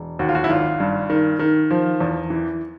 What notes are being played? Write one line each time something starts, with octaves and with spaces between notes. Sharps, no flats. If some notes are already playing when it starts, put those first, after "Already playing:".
Already playing: E1
D#2 F#4
F4
F#4
E4
G#1 F4
G2
D#3
D#3
F3
E2
E3